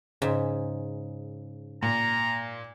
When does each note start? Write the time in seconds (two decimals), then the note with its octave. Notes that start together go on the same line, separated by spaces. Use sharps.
0.22 G#2 C#3 D#4
1.82 A#2 A#5